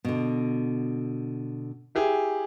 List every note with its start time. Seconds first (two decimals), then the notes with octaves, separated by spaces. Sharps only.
0.05 B2 D3
1.95 E4 G4 G#4